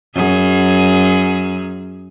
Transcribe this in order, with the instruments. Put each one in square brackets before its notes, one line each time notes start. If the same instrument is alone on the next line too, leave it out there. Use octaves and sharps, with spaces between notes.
[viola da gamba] F#2 G#4